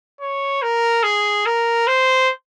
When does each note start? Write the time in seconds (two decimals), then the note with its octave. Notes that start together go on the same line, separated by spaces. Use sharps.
0.20 C#5
0.62 A#4
1.03 G#4
1.46 A#4
1.87 C5